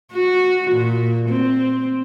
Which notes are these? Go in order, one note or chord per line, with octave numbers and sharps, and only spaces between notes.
F#4
A#2
C4